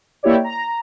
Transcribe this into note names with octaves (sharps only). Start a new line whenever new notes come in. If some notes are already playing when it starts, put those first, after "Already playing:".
A#3 E4 G4 C#5 D5
A#5